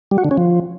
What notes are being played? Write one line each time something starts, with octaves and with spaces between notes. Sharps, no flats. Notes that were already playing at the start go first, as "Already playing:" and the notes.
G3
F#4
D3
C#4
F3